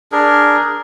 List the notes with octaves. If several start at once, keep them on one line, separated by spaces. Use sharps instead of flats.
D4 G#4 A#4